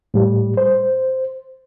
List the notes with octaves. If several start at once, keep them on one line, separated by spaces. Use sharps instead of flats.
A2 G3
C5